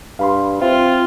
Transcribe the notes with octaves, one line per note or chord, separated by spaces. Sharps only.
G2 F5 B5 C6
C4 F4 E5 F5